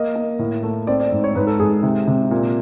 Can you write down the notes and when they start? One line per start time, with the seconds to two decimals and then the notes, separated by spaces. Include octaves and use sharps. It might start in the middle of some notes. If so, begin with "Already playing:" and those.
Already playing: A#3 D#5
0.16 A#3
0.39 A2
0.63 A3
0.87 C4 D5
1.00 D5
1.11 G#2
1.24 C#5
1.35 G#2 B4
1.47 A4
1.59 G#2 G#4
1.83 C3
2.07 C3
2.31 A#2